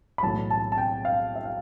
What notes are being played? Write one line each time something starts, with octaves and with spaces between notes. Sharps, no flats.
B5
B1 A2 E3 A3 A5
A5
A5
G5
F5
E5
F5